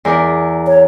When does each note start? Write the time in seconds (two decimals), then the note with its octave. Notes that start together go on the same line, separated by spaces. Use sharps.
0.05 E2 A#4 D5
0.67 C#5